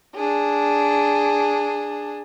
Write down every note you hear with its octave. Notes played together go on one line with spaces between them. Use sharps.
D4 G#4